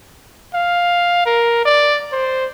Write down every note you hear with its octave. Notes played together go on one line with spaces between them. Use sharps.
F5
A#4
D5
C5